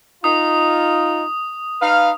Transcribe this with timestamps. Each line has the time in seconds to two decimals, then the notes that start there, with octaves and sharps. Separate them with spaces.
0.24 D#4 F4 D#6
1.82 D#4 B4 F5